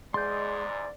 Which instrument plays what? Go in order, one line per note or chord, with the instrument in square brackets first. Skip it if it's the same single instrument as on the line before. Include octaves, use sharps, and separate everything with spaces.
[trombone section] E2 G#2 [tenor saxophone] G#3 [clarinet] D5 [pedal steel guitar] C6 G6